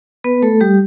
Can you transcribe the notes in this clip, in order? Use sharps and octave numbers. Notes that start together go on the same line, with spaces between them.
B3 B4
A3 A4
G3 G4